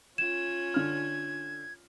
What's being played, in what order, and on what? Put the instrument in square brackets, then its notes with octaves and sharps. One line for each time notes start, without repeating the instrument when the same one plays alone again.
[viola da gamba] C#4 F4 [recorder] G#6 [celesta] E7
[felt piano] D3 F6